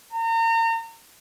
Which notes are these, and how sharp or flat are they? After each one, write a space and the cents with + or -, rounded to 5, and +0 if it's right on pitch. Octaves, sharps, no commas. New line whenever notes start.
A#5 -35